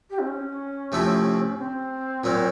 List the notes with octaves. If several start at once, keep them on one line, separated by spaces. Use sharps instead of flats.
G4
C4
C#4
C3 F3 A3 C4 E4
C4
A#2 F#3 A#3